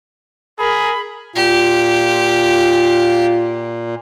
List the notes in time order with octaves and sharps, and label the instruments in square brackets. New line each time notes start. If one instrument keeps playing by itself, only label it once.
[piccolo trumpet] G#4 [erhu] A#4 [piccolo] B5
[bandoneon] A#2 [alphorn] F4 [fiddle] G4